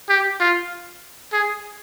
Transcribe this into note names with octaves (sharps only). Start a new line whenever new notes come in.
G4
F4
G#4